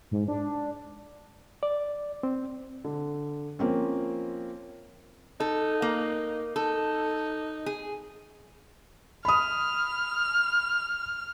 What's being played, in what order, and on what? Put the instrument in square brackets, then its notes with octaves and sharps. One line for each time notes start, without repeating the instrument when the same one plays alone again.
[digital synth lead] G#2
D4
[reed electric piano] D5
C4
[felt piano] D3
F3 A#3 C4 C#4
[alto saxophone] D#4 [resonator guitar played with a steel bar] A4
[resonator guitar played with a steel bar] A#3
[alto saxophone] D#4 [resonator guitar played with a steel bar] A4
[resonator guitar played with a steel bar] G#4
[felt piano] B5 D#6 [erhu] F6